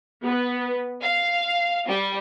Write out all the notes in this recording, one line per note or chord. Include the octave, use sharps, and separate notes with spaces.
B3
F5
G3